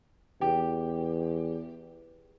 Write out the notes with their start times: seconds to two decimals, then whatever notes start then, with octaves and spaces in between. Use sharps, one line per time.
0.41 E2 G4